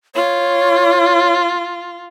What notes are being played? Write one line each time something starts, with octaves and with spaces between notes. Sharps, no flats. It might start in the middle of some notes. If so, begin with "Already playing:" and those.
F4 C#5